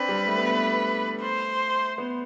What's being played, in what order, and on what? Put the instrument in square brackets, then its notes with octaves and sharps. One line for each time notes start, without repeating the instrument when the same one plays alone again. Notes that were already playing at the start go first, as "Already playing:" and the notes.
Already playing: [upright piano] C4 D4 [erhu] B4
[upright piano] G3
A3
B3
A3
[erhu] C5
[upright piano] B3